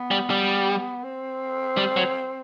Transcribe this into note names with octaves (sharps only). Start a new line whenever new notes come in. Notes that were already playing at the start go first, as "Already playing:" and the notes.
Already playing: B3
G3
G3
C4
G3
F#3